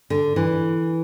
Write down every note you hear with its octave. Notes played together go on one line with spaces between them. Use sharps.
D3
E3